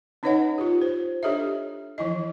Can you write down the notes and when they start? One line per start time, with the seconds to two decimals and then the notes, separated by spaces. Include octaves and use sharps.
0.23 C#4 D#4 B4 C#5 D#5 F#5
0.58 F4 G4
0.82 C5
1.23 D4 G4 A4 C#5 D#5 E5
1.98 E3 F3 E4 D#5